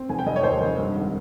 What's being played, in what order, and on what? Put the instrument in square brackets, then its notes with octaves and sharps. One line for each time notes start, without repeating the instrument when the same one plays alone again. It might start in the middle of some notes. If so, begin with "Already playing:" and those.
Already playing: [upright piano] C4
F1 G#5
G5
F1 D#5
C#5
D#2 C5
F1
G2
G#1